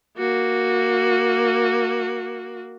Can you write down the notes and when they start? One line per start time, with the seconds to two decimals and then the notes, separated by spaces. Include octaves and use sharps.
0.18 A#3 F#4